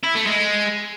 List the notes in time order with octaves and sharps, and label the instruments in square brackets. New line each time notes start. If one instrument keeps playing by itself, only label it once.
[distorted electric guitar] E4
A3
G#3